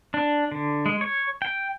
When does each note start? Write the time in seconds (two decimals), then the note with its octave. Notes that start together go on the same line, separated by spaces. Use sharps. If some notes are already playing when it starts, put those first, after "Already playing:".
0.14 D4
0.52 D3
0.86 G#3
1.01 C#5
1.42 G5